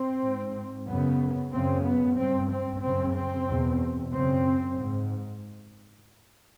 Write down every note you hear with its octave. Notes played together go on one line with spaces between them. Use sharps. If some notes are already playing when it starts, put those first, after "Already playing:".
Already playing: C4
G#2
F#2 C#3 B3
F#2 C#3 C4
B3
G2 C4
C4
F#2 C#3 C4
C4
E2 B2
F#2 C#3 C4
G#2